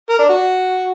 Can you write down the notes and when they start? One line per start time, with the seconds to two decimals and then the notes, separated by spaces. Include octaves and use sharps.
0.09 A#4
0.19 D4
0.29 F#4